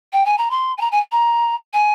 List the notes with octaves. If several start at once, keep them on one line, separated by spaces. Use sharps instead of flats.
G5
G#5
A#5
C6
G#5
A#5
G#5
A#5
G#5